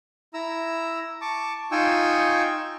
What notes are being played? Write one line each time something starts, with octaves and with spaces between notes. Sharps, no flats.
E4 A#5 E6
A5 C#6 D6
D#4 F4 G5 G#5 C#6 E6